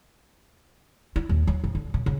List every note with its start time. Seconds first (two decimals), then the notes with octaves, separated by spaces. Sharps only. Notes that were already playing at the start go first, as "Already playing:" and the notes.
1.16 E4
1.29 D#2
1.47 F#3
1.64 F2
1.75 D3
1.94 C#3
2.06 C#3